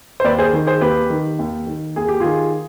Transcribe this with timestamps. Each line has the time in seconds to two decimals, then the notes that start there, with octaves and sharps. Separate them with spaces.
0.20 C5
0.24 D#2 B4 D5
0.38 G#4 C5
0.53 D#3
0.67 G#4 C5
0.81 D#2 G4 B4
1.10 D#3
1.39 D#2
1.67 D#3
1.96 D#2 G#4
2.08 G4
2.20 D#3 F4 G#4